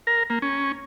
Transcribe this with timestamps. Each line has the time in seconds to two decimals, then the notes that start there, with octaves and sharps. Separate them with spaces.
0.07 A#4
0.30 A#3
0.42 C#4